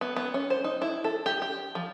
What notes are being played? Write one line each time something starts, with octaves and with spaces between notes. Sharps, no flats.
B3
B3
C#4
C5
D#4
E4
A4
G4
G4
F3